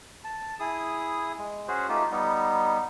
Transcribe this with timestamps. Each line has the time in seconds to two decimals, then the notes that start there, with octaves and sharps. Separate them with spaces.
0.25 A5
0.60 E4 G#4 D#6
1.38 G#3
1.68 C#4 F#4 G#4 C5
1.89 A3 D#4 F4 G4
2.11 G3 B3 D#4